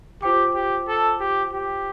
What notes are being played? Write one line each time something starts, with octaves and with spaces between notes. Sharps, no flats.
F4 G4 C5 G5 D6
G4
A4
G4
G4